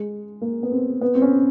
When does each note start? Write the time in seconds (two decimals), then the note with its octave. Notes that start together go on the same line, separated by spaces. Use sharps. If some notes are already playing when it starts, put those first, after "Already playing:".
Already playing: G#3
0.41 A#3
0.63 B3
0.72 C4
1.01 B3
1.15 C4
1.22 C#4